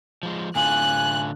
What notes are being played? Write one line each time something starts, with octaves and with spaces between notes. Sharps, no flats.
F3 G#3
A2 D3 F4 G#5 F#6